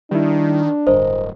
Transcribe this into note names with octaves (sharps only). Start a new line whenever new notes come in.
D#3 G3 D4 E4
D1 G2 A#4 C5 D#5